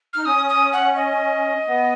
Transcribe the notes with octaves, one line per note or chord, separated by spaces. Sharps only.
D#4 F6
C#4 D#6
D#6
F#5
D#5
B3